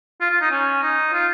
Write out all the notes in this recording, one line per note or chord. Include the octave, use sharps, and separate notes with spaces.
F4
F4
D#4
C#4
D#4
F4